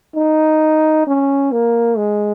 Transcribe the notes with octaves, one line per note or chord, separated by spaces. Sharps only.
D#4
C#4
A#3
G#3